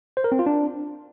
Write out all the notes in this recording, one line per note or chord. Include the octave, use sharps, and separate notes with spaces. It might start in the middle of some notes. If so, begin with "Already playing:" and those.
C5
A#4
C4
F4
D4